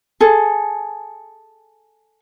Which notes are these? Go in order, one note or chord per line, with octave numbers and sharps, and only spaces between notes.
G#4 A4